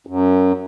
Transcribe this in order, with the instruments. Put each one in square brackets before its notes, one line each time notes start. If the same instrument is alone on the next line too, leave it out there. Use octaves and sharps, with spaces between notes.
[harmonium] F#2